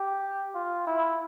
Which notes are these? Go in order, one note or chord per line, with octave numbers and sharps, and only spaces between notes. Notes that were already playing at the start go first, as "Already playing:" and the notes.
Already playing: G4
F4
E4